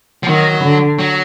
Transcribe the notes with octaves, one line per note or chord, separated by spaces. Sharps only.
F3
D#3 F#3
D3
F#3